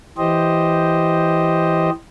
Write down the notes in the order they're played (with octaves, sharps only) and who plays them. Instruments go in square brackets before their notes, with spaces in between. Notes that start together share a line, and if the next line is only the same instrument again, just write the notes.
[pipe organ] E3 G4 C5 D#5